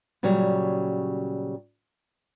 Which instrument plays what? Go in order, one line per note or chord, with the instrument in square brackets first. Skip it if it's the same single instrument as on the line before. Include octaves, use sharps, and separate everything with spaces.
[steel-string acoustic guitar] A#2 C#3 F#3 G3